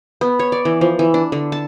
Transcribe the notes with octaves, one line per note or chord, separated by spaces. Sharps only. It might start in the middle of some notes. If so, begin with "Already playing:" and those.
B3
C#5
D5
E3
F3
E3
D4
D3
A5